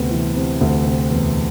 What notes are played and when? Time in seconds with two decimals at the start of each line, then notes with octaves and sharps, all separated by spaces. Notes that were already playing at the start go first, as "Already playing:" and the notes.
Already playing: D2 C3 B3
0.10 E3
0.35 C3
0.61 D2
0.85 C3
1.10 E2